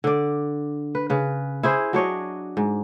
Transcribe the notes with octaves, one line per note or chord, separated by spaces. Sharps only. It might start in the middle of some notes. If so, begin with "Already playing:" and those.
D3 D5
B4
C#3 B4
E4 G#4 C5
F#3 D4 C#5 D#5
G#2